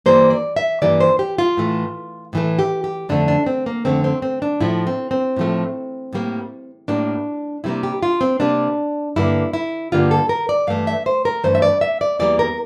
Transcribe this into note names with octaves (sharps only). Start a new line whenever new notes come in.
G2 E3 G3 A#3 C5
D5
E5
G2 E3 G3 A#3 D5
C5
G4
F4
A2 E3 A3
A2 E3 A3
G4
G4
F2 D3 A3 D4
D4
C4
A#3
F2 D3 A3 C4
C4
C4
D4
A2 F3 A3 E4
C4
C4
A2 F3 A3
A2 G3 A#3
A2 G3 A#3 D4
C3 G3 A#3 E4
G4
F4
C4
C3 G3 A#3 D4
G2 D3 G3 A#3 E4
E4
G2 D3 G3 A#3 F4
A4
A#4
D5
G2 E3 A3 F5
E5
C5
A#4
G2 E3 A3 C5
E5
D5
E5
D5
E2 E3 G3 A#3 D5
A#4